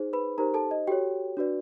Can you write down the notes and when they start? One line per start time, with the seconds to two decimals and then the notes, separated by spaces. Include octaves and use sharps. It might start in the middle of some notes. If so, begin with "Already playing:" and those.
Already playing: D#4 G#4 C5
0.13 B4 B5
0.38 D#4 G4 A#4 C5 A#5
0.54 A4 A5
0.71 D#5
0.87 F#4 G4 A4 C#5 G5
1.37 D4 F#4 B4 D5